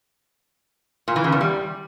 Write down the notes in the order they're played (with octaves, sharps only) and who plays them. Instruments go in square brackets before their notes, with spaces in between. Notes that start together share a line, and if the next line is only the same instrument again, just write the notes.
[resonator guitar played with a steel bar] A#2
E3
C#3
E2
G3